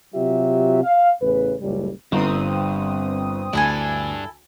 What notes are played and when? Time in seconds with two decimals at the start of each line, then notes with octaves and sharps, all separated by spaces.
0.14 C3 F#3 F4 G4 E5
0.83 F5
1.21 A1 E2 C#3 B4
1.60 F#1 C#2 A2 G3
2.12 G1 G2 C4 A#5 D#6
3.53 D2 G2 D4 E4 A4 G#5